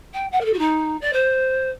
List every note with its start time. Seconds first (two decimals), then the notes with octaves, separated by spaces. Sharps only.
0.13 G5
0.32 F#5
0.40 A#4
0.44 A4
0.53 F#4
0.58 D#4
1.01 D5
1.13 C5